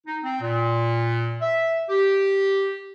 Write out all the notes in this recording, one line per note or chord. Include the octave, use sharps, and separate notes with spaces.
D#4
C4
A#2
E5
G4